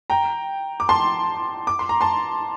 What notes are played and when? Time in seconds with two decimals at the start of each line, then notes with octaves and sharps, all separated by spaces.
0.10 G5 A#5
0.80 D6
0.89 A5 C6
1.67 D6
1.79 C6
1.89 A#5
2.01 A5 C6